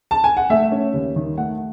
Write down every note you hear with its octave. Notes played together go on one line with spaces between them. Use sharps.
A5
G#5
F#5
A3 E5
C#4
D#2
D#3
A3 F#5